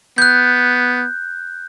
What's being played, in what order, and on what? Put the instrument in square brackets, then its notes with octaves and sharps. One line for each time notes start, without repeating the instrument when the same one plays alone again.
[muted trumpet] B3 [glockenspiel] F#6 G6